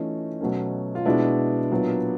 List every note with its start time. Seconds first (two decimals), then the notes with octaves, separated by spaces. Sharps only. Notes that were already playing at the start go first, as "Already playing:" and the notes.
Already playing: E3 A3 C#4 D#4 F4
0.41 B2 F#3 A3 C#4
0.95 F4
1.05 B2 G#3 B3 D4 E4
1.71 A#2 F#3 B3